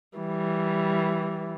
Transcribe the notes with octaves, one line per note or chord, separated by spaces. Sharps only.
E3 G3